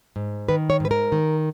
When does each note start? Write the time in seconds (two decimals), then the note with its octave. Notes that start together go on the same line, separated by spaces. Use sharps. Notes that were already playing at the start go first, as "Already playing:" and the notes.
0.16 G#2
0.49 D#3 B4
0.70 C#5
0.80 G#2 B4
0.91 A#4
1.12 D#3